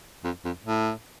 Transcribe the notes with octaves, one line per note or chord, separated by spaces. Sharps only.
F2
F2
A2